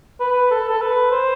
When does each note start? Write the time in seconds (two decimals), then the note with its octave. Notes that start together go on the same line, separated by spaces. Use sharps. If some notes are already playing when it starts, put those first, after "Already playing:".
0.20 B4
0.51 A4
0.69 A4
0.81 B4
1.11 C5